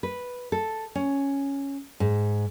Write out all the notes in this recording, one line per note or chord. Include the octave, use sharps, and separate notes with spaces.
B4
A4
C#4
G#2